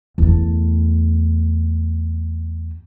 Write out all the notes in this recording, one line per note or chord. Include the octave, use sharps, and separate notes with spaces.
E2 A3